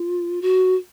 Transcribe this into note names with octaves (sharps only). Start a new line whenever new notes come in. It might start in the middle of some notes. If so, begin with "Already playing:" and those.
Already playing: F4
F#4